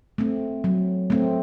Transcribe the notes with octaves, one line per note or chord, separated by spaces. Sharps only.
A3 C4
F#3
A3 C4